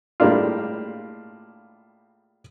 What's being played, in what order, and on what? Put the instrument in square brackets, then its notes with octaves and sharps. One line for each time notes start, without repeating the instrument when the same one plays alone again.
[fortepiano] A2 G3 G#3 A#3 D4 F4